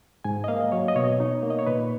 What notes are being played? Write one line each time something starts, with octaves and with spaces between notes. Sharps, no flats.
G#2 G#5
D#5
A#3 F5
F#3 C#5
D#5
B2 C#5
D#4
A#3
D#5
C#5
A#2 B4